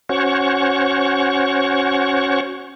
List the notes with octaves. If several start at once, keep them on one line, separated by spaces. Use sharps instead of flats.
C#4 F#4 C5 C#5 F#5 C#6